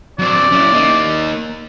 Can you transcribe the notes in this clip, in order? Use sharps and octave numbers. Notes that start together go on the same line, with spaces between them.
F#3 C4 D5
C#4 E4
A#3 D#4